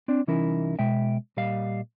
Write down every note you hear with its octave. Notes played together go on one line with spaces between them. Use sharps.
C4 D4 D5
C2 E3 C#4 D#4 E4 A#4
B2 G#3 E5 G5
A#2 G3 D#5 F5